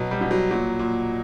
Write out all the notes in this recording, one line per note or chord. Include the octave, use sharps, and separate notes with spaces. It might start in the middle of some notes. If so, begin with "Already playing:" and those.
Already playing: B2 F#3
G3
B2
F#3
A#2 F#3
A#2